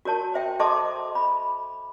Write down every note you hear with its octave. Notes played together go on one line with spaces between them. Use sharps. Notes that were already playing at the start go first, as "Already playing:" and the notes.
F#4 A#4 C#5 A5
C5 E5 G5
A4 D#5 E5 A5 C6 D6
B5